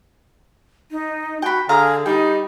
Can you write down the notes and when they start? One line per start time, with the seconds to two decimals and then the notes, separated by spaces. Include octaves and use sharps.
0.91 D#4
1.42 F#4 G5 B5
1.69 D3 G#4 F5 A#5 D#6
2.06 G3 D#4 G5